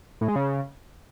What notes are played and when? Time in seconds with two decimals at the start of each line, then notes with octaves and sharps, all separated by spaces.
0.21 A2
0.28 G#3
0.36 C#3